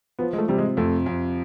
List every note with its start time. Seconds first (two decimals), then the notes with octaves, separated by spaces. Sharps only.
0.19 F3 B3
0.33 G#3
0.38 A3
0.48 C3 G3
0.58 G#3
0.77 F2 A3
1.06 F2